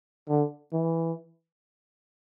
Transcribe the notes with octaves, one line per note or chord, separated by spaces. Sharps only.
D3
E3